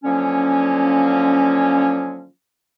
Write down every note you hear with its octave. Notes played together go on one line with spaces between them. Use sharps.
D3 F3 F#3 A#3 C#4